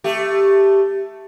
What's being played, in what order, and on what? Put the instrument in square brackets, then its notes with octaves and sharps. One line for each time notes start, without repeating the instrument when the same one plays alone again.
[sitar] A3 G4